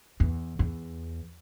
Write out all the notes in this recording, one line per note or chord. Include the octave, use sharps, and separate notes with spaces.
E2
E2